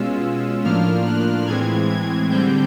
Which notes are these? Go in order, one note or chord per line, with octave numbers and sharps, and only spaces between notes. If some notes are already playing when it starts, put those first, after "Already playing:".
Already playing: B2 G#3 C#4 F4 E6
A2 F3 A#3 D4 F4 F6
F#6
A2 E3 G#3 C4 G#6
G#6
D3 G3 C4 G6